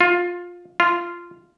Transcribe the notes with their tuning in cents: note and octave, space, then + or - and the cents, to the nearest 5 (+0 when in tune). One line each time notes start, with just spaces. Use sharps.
F4 +15
F4 -10